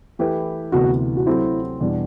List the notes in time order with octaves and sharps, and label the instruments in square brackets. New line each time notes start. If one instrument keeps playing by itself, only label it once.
[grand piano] E3 A3 E4 G4 B4
[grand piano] D2 C3 E3 B3 [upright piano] F#4
[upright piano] F#4
[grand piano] F#3 A3 C4 G4 C5 [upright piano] E4
[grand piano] E2 B2 G3 D4 G4